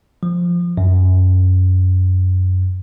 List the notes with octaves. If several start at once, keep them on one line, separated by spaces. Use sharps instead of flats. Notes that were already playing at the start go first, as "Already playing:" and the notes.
F3
F#2